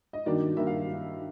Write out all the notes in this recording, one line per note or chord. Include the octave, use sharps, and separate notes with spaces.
D#5
G2 D#3 F#3 A#3 D4 D5
G2 D#3 F#3 A#3 D4 E5
F5